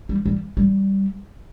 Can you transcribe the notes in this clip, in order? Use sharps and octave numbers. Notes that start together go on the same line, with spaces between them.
G3
G3
G3